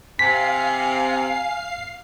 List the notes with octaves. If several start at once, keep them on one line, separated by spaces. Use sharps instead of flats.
C3 F5 G#5 B6 C7